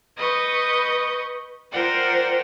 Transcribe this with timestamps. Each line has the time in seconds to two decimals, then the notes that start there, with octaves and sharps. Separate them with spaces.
0.17 B4 D#5 C#6 G6
1.71 F4 A#4 C5 D5 F#5 G5